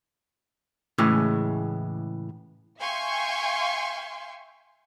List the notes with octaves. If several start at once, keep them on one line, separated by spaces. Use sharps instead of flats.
A2 C#3 E3 G#3
E5 F5 G5 G#5 C6 C#6